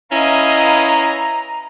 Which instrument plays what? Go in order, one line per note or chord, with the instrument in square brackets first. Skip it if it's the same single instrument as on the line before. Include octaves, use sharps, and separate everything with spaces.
[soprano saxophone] C#4 [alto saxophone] E4 [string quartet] B4 D#5 F5 [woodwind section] A#5